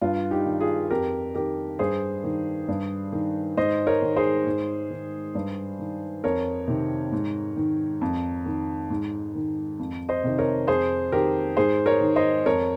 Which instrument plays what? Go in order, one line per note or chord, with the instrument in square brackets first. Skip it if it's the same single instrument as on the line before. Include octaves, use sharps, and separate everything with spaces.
[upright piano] G2 F4
D#4 G4
D#3
F4 G#4
F2 G4 A#4
D#3 G4 A#4
G2 G#4 C5
D#3
G2
D#3
G#2 C5 D#5
A#4 C#5
D#3
G#4 C5
G#2
D#3
G2
D#3
F2 A#4 C#5
C3 D#3
G#2
D#3
F2
D#3
G#2
D#3
F2
C5 D#5
C3 D#3
A#4 C#5
F2 G#4 C5
D#3 G4 A#4
G#2 G#4 C5
A#4 C#5
D#3
C5 D#5
F2 A#4 C#5